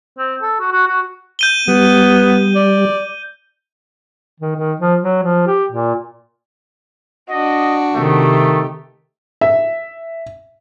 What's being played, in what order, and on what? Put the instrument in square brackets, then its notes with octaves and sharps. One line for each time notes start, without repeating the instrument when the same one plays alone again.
[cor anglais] C4
A4
F#4
F#4
F#4
[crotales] G6 D#7 G7
[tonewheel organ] G3 [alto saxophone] B3
[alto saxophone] D5
[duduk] D#3
D#3
F3
F#3
F3
G4
A#2
[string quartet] D4 F#4 [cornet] D#5
[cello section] C3 G4 [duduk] D#3 [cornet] A3
[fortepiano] E5